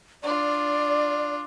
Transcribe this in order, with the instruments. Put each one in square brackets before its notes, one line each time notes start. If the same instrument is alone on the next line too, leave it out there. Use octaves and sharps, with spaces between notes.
[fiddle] D4 F4 [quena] D5